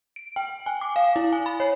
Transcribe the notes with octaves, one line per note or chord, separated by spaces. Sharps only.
D7
G5
G#5
D6
F5
E4
G#5
B5
C#5